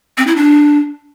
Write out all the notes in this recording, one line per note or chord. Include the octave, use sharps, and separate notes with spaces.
C4
E4
D4